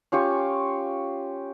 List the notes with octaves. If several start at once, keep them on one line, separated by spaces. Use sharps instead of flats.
C#4 F4 G4 C#6